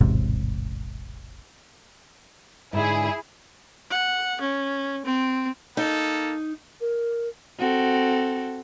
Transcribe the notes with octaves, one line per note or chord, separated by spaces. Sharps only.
E1 A1 G#2 C3
G#2 D3 E4 G#4
F#5
C#4
C4
A#3 D#4 A4
A#4
C4 F#4 A4